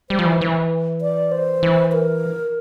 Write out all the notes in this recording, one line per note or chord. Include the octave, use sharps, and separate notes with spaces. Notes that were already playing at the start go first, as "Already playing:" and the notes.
G3 C5
F3
E3
E3
D5
C5
E3
A#4